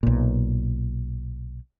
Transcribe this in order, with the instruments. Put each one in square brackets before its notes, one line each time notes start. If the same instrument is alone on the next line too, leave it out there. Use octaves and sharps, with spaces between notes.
[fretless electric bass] B1 A#2